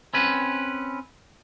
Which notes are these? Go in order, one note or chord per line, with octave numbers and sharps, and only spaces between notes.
C4 C#4 B4